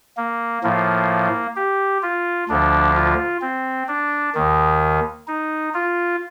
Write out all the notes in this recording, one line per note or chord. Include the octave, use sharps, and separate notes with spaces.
A#3
A2 F3 A#3
G4
F4
D2 D3 F3 D4
F4
C4
D4
D#2 D#3
D#4
F4